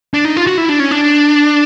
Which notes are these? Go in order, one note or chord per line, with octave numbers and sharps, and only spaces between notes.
D4
D#4
F4
F#4
E4
D4
C#4
D4